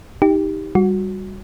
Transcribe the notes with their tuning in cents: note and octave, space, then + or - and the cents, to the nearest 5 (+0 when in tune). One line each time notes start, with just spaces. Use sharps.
D#4 +20 G4 +5
G3 +0 F#4 -15